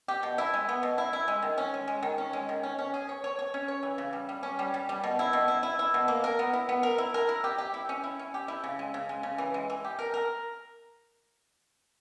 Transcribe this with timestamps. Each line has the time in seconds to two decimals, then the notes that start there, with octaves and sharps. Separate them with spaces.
0.08 G4
0.23 B2
0.38 E4
0.54 G#3
0.69 B3
0.83 B2
0.98 E4
1.13 E4
1.28 G#3
1.43 D#3
1.58 C#4
1.74 G#3
1.88 G#3
2.03 D#3
2.18 C#4
2.33 G#3
2.49 D#3
2.63 C#4
2.79 C#4
2.94 G#4
3.09 C#5
3.24 C#5
3.39 C#5
3.54 C#4
3.68 C#5
3.83 E3
3.98 C#3
4.13 G3
4.29 G3
4.43 C#4
4.59 G3
4.74 G3
4.89 G3
5.04 B2
5.19 E4
5.33 B2
5.48 E4
5.63 E4
5.79 E4
5.94 B2
6.08 A#3
6.24 A#4
6.39 B3
6.53 E4
6.69 B3
6.83 A#4
6.98 E4
7.14 A#4
7.29 E4
7.44 G4
7.58 G4
7.74 E4
7.89 C#4
8.04 E4
8.19 C#4
8.34 G4
8.48 E4
8.64 C#3
8.79 G#3
8.94 C#3
9.09 G#3
9.23 C#3
9.38 E3
9.54 G#3
9.70 E3
9.84 G4
9.99 A#4
10.14 A#4